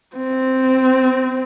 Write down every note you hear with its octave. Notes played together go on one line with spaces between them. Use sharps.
C4